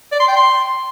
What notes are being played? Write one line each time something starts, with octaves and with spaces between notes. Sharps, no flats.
D5
C6
G5
C6